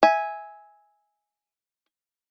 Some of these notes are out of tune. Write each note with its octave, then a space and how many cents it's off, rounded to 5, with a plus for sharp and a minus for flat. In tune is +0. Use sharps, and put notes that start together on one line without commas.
E5 -15 G#5 +0